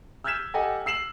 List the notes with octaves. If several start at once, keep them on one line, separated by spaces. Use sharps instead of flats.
E6 F6 G6 G#6 B6 E7
G4 A4 D#5 F#5 G#5
E6 C7 E7 F#7